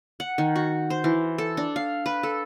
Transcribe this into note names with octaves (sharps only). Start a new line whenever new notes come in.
F#5
D#3
F#4
C5
E3
A4
D4
F5
B4
A4